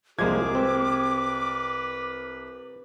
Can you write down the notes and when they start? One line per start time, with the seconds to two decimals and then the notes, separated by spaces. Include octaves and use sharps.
0.19 C2 F3 G#3 A#3 G#4 D6 G#6
0.55 C4 B4